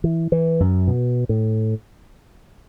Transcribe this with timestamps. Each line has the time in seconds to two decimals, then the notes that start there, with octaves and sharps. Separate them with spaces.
0.04 E3
0.32 E3
0.60 F#2
0.88 B2
1.29 A2